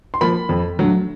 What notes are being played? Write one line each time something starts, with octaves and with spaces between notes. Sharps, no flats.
C6
F3 A#3 B5
F2
D3 F#3 A3